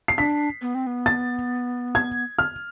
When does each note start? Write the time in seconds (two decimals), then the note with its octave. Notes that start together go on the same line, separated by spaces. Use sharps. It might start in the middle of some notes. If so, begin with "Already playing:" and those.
0.08 C7
0.18 D4 B6
0.62 B3
0.75 C4
0.87 B3
1.06 A6
1.95 G#6
2.38 F6